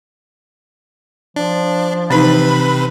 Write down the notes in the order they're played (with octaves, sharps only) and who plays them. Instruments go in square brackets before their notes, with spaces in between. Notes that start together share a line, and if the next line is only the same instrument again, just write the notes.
[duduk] F3 [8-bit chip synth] D4
[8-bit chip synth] C3 B4 [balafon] E3 D#4 [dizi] B5